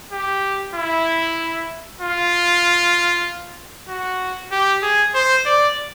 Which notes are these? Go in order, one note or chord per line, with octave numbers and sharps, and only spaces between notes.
G4
E4
F4
F#4
G4
G#4
C5
D5